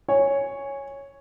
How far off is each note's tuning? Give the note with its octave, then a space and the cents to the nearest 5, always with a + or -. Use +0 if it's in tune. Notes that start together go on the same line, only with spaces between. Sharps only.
C#5 +0 G#5 -10